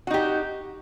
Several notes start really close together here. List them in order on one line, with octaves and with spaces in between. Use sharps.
F#4 D#4 G4